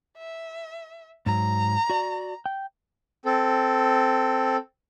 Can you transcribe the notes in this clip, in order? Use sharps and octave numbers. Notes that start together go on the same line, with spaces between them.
E5
G#2 F#3 A#5
F#4 D5
G5
C4 A4